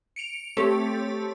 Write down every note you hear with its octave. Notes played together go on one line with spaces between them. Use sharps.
C#7 D7 F7
A3 C4 G4 A4 C#5